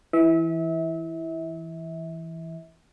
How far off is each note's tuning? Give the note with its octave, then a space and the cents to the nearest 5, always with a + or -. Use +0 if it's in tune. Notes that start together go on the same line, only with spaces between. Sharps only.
E3 +0 E5 -30